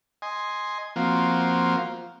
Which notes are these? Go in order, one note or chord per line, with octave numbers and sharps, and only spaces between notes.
D#5 G#5 C6
F3 A#3 C4 F4 F#4